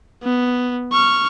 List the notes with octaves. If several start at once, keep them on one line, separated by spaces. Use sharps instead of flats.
B3
C#6 F6